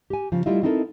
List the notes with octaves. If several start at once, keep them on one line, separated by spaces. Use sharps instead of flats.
G4 G#5
C#3 F3
G3 A3 E4 F4 D#5 E5
C4 D#4 E4 F#4 A4 A#4